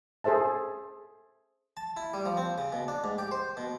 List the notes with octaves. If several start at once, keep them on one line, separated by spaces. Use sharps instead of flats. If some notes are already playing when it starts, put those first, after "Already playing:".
G#4 A4 C5 E5 A5
A5
E4
G3
F3
C4
C#3
B2
D4
G#2
G4
C5
B2